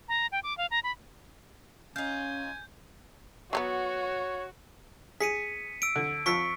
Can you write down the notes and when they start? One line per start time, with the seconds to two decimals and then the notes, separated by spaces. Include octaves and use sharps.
0.08 A#5
0.32 G5
0.43 D6
0.58 F5
0.71 A#5
0.83 B5
1.96 C#4 D#4 F4 G#5 G6
3.53 F#3 G3 B3 F#4 C#5
5.20 G#4 B6 C#7 D#7
5.82 E6 D7
5.95 D3
6.26 F2 F3 C#6 E6 B6 C#7